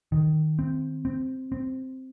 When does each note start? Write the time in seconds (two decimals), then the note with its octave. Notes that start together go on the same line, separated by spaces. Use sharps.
0.12 D#3
0.59 C4
1.05 C4
1.52 C4